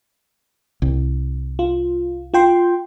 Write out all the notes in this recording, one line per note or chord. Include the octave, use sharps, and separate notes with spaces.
C2
F4
F4 G5 C6